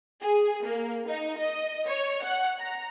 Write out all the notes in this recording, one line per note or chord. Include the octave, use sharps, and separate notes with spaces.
G#4
A#3
D#4
D#5
C#5
F#5
A#5